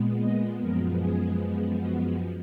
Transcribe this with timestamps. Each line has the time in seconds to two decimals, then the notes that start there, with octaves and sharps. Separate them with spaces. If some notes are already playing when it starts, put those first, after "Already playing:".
Already playing: A#2 G#3 B3
0.20 D#5
0.60 F#2 F3 G#3 B3 A#4
1.01 G#4
1.80 F#4